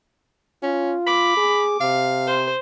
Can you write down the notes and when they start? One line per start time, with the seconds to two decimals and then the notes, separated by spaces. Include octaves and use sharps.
0.63 C#4 F4
1.07 B5 D6
1.37 G#4
1.81 C3 F5
2.27 C5